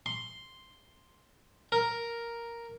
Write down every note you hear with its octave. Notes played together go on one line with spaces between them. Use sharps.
C6
A#4